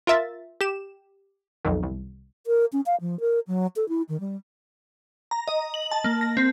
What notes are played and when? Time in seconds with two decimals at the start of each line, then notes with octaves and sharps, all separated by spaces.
0.07 F4 A#4 E5 A6
0.61 G4 E7
1.65 B1 F2 D#3
1.83 C2
2.47 A#4
2.73 C#4
2.86 F5
3.01 F3
3.20 A#4
3.47 F#3
3.76 A4
3.89 E4
4.09 D#3
4.20 G3
5.31 A#5
5.48 D#5
5.74 F#7
5.91 A5
6.04 A#3
6.21 A#6
6.37 C4